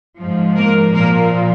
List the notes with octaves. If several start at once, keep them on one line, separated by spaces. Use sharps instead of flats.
G#2 F3
A#3 A#4
A#2 F3 A#3 A#4